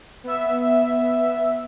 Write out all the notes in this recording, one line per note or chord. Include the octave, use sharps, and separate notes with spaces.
B3 E5